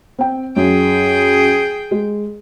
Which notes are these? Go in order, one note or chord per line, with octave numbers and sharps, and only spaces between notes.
C4 G5
F#2 G#4 G5
G#3